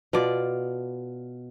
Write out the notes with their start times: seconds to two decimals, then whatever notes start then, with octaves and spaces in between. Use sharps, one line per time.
0.13 B2 F4 D5